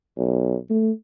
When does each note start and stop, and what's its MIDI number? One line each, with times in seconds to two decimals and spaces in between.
0.17 0.55 35
0.70 0.91 57